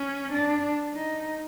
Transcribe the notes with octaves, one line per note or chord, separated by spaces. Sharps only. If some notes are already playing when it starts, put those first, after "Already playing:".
Already playing: C#4
D4
D#4